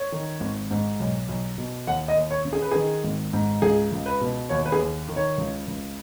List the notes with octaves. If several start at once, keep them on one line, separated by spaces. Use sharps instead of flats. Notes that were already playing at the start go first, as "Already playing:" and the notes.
Already playing: C#5
D#3
G#1
G#2
B1
B1
B2
D#2 F#5
D#5
D#2
C#5
C#3
G#4
B4
D#3 G#4
G#1
G#2
C#2 G#4
C#2
B4
B2
D#2 C#5
B4
G#4
D#2
D#3
C#5
C#2
C#2